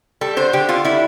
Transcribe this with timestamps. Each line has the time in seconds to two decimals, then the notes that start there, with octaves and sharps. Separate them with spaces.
0.21 G3 A4
0.36 D3 C5
0.53 D3 G4
0.69 D3 F4
0.84 G3 E4